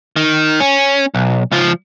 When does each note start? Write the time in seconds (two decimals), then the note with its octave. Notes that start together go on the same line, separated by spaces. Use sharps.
0.16 D#3
0.60 C#4
1.14 B1
1.51 C#2 F3